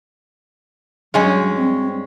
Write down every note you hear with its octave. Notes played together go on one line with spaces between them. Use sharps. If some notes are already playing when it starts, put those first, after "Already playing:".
G2 F#3 G#3 C#4
C4